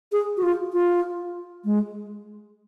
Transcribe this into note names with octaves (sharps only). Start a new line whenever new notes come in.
G#4
F#4
F4
F4
G#3